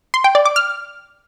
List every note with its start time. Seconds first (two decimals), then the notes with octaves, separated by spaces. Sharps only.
0.14 C6
0.24 G5
0.35 D5
0.45 D6
0.56 F6